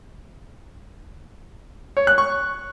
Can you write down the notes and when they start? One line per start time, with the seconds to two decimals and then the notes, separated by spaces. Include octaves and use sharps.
1.97 C#5
2.07 F#6
2.18 C#6